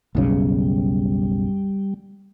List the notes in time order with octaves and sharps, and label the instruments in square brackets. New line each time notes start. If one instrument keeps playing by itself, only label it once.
[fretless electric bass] F#1 B1 C#3 [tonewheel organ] G3